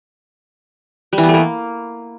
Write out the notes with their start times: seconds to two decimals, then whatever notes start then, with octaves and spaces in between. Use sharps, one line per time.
1.13 G3
1.18 E3
1.23 B3
1.29 A3
1.34 A#3